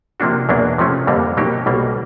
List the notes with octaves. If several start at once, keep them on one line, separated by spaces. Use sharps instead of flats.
C3 F3 A#3 D4 F#4
E2 B2 F#3 A#3 D4
C3 F3 A3 C#4
F2 D3 G3 A#3
B2 F#3 A#3 D#4 G4
B1 B2 G3 A#3